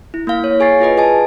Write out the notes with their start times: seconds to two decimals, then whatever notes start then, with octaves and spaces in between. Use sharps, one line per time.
0.14 E4
0.27 A#3 E4 F5
0.44 C#5
0.60 G#4 G#5 C#6 A6 C7
0.80 F4 G#4 B4 D#5
0.97 G#4 D#5 G#5 A5